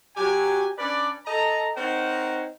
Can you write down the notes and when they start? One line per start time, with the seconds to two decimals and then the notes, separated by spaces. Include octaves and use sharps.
0.17 F#3 G4 G#5
0.78 C#4 D4 B4 D5
1.26 A4 D#5 A#5
1.76 C4 D#4 A#4 C5 C#5 F#5